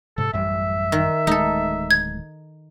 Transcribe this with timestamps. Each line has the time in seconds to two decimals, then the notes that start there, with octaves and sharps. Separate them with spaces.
0.18 G#2 C3 A4
0.33 A1 F#2 G3 E5
0.92 D#3
1.27 D1 G#3 A3 D#4 A4
1.91 G#6